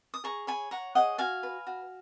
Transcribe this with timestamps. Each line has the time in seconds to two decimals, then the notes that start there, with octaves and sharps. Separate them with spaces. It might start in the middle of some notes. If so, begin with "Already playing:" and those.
0.14 D#6
0.24 G#4 A#5 C#6
0.47 C#5 G#5 B5
0.71 C#5 F#5 A#5
0.95 G#4 D#5 F#5
1.18 F#4 F5 G#5
1.43 B4
1.67 F#4